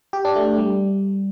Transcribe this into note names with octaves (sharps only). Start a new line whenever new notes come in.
G4
D4
A3
G3